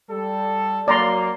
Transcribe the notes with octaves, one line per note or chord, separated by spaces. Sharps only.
G3 A4
F#3 A#3 D5 A#5 C6